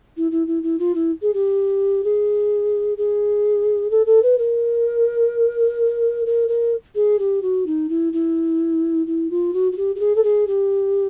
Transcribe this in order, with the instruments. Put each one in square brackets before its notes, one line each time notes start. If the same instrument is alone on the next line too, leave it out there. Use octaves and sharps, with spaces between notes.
[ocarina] E4
E4
E4
E4
F4
E4
G#4
G4
G#4
G#4
A4
A4
B4
A#4
A#4
A#4
G#4
G4
F#4
D#4
E4
E4
E4
F4
F#4
F#4
G4
G4
G#4
A4
G#4
G4